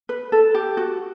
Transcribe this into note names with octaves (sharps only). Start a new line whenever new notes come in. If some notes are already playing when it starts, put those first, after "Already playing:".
B4
A4
G4
F#4